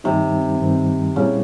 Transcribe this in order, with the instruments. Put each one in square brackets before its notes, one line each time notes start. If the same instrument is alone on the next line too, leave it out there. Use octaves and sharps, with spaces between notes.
[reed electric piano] G2 D#3 G3 C4 D#4 [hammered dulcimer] C3
[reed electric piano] G2 D#3 G3 C4 D#4
[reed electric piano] A#2 G3 C4 E4 [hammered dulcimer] C#3